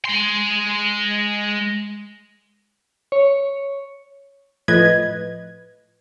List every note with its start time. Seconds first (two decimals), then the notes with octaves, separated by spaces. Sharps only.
0.05 G#3 C6
3.12 C#5
4.68 A2 F3 B4 D#5 G#6